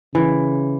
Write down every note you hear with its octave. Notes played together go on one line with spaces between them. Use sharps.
C#3 E3